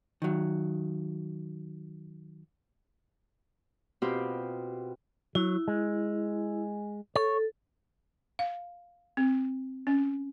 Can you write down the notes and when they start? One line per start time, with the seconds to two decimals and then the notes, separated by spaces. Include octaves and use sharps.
0.22 D#3 F#3
4.02 B2 C4 F4 G4
5.35 F#3 E4
5.68 G#3
7.16 A4 C#5
8.39 F5
9.17 C4
9.87 C#4